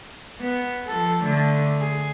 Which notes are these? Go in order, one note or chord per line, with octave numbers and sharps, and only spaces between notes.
B3
F3 A4
D3 A3
G#4